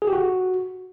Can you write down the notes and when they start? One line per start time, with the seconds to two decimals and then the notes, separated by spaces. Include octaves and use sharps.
0.02 G#4
0.07 G4
0.13 F#4